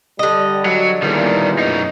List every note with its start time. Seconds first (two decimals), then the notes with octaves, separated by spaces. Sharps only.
0.19 D3 G3 D#5
0.66 F#3
1.03 E2 A#2 D#3 G3
1.59 F#2 D#4